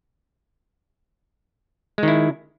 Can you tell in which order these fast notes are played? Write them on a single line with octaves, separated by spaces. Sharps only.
G#3 D#3 E4